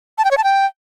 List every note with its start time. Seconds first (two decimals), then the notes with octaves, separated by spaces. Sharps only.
0.18 A5
0.25 G5
0.31 C#5
0.37 A5
0.44 G5